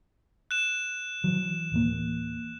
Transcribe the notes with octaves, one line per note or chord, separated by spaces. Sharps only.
F#6 E7
E3 F#3
D1 E3 A#3